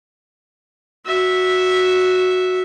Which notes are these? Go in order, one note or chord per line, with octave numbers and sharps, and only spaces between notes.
F#4 E5